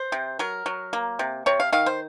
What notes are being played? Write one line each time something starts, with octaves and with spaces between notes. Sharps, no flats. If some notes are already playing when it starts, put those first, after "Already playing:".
Already playing: C5
C3
F#3 A#4
F#3
A#3
C3
C3 C#5
F5
D#3 F5
C5